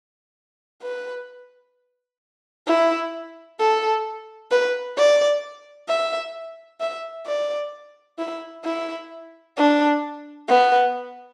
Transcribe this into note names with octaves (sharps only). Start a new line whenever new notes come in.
B4
E4
A4
B4
D5
E5
E5
D5
E4
E4
D4
B3